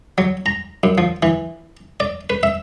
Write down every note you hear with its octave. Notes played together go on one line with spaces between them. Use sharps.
F#3
A#5
F#2
F3
E3
D5
B4
E5